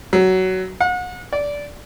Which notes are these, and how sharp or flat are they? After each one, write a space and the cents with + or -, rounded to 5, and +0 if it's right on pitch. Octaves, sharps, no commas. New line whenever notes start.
F#3 +15
F#5 -35
D5 -15